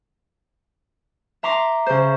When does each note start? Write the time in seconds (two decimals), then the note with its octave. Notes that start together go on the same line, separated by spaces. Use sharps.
1.43 E5 A#5 C6 D6
1.86 C#3 C5